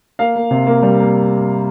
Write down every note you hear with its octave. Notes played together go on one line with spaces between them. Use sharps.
A#3 F5
A#3
C3
A#3
G3
A#3